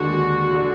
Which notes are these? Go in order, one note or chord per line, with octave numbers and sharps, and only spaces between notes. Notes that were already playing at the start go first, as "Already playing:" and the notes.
Already playing: D#2 D3 G#3 D4 F#4
D3 G#3 D4